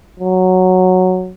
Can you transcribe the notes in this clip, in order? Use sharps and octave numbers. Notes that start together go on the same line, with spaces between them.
F#3